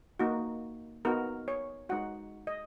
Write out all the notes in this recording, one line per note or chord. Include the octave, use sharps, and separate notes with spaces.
A#3 D#4 F#4
B3 D#4 F#4 A#4
C#5
G#3 D#4 F#4 F#5
D#5